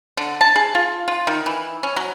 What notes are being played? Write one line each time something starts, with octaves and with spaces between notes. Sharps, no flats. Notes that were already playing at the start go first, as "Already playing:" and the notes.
D3
A5
G#4
F4
F4
D#3
E3
C#4
F#3